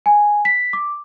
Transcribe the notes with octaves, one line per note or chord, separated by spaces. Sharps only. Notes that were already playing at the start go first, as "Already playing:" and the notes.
G#5
B6
D6